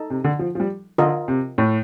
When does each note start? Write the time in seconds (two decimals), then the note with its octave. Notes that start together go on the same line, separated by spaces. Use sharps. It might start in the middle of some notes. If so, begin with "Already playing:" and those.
Already playing: D#4 A4
0.10 C3
0.24 D3
0.39 F3
0.55 F3
0.60 G3
0.98 D3 F4 A#4 D#5
1.28 C3
1.58 A2